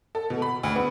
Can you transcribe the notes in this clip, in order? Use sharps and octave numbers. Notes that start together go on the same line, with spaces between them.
A4
B2
B5
D2
B3